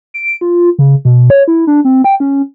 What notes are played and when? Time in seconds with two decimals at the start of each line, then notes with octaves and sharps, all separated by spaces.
0.14 D7
0.41 F4
0.79 C#3
1.05 B2
1.30 C#5
1.48 E4
1.67 D4
1.85 C4
2.04 G5
2.20 C#4